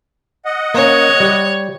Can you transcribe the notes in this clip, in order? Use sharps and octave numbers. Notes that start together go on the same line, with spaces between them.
D#5 F#5
A#3 C#4 C#5
G3 G4